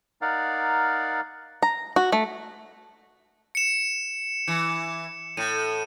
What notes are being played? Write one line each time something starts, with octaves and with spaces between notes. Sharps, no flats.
D#4 A#4 D5 F5 F#5
A#5
F#4
A3
C#7 E7
E3
A2 D#7